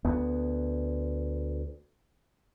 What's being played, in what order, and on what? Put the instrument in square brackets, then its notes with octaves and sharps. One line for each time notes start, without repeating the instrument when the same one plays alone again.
[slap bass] D2 B3